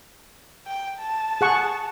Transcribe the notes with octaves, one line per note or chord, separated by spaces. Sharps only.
G5
A5
G#4 F#5 C#6